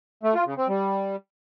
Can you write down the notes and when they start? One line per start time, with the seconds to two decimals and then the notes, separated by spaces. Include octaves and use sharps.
0.23 A3
0.35 F4
0.46 C#3
0.57 C4
0.68 G3